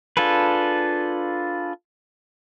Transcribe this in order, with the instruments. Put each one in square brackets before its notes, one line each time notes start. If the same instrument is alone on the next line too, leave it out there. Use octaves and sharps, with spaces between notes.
[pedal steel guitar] D4 F4 G#4 A4 B4